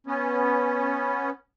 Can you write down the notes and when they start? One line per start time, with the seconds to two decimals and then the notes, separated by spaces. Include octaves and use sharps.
0.07 B3 C#4